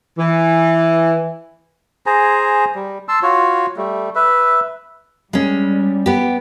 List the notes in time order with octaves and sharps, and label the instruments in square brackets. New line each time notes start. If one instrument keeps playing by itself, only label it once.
[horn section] E3
[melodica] G#4 C5 G#5 A#5
G3
A5 C6 E6
F4 F#4 C#5
G3 A3
B4 E5
[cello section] G3 [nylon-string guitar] G#3 C#4
[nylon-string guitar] B3 G4